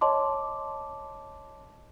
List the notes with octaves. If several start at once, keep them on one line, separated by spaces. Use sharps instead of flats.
C#5 D#5 A5 C6 D6